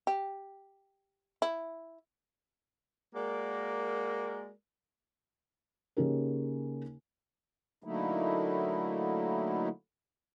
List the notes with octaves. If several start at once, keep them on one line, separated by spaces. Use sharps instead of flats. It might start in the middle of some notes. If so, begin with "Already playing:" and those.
G4
E4
G#3 A#3 F#4 A#4 D5
C#3 A#3 C#4 D#4 G4 A#4
D3 F#3 A3 A#3 D#4 E4